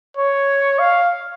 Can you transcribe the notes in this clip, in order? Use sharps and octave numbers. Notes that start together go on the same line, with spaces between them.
C#5
F5